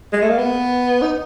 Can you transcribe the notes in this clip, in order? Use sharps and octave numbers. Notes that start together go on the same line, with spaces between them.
G#3
A3
A#3
B3
D#4